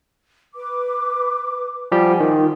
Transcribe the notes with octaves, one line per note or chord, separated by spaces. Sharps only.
B4 D6
F3 G3 G4 F#5 G#5
D#3 F4